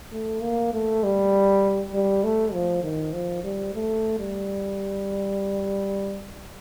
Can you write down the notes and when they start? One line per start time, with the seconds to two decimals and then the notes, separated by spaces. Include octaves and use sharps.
0.13 A3
0.42 A#3
0.73 A3
1.03 G3
1.94 G3
2.24 A3
2.53 F3
2.83 D#3
3.13 F3
3.44 G3
3.75 A3
4.19 G3